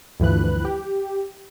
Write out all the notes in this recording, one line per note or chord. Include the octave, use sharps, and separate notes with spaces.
D2 G2 E3 F3 B4 F#6
G4